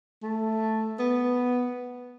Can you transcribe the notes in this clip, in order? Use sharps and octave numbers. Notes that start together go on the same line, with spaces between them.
A3
B3